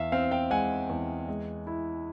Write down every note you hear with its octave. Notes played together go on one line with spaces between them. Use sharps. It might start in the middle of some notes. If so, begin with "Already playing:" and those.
Already playing: E2 E5 F5
C4 F5
F5 G5
G#3 F#5 G#5
E2
G#3
E4